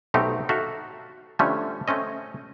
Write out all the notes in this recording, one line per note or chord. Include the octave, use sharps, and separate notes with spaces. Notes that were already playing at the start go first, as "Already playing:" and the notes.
B1 B2 A3 C4 D#4 G4
D#4 F#4 A4 E5 F5
D3 F3 G3 A3 C#4 D4
A3 C4 C#4 D#5